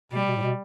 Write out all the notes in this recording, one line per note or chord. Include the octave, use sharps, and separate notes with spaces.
B2 G3
B2
A2
B2